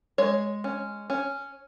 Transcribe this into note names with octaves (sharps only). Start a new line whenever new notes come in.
G#3 C#5
C#4
C#4